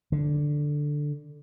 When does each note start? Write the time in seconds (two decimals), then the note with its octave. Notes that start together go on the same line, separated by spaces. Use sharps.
0.12 D3